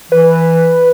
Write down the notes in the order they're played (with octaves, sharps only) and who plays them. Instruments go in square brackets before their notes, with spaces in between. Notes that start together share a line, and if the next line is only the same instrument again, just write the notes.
[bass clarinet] E3 [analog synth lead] B4